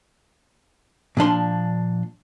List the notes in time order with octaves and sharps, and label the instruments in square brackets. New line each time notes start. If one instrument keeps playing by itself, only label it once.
[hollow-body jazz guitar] A#2 F3 D4 C6